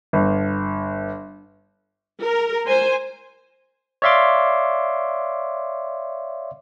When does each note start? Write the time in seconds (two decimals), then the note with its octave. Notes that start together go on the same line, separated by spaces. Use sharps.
0.13 G1
2.22 A#4
2.66 C5 G#5 C6
4.02 C#5 D5 E5 F5 C6 D6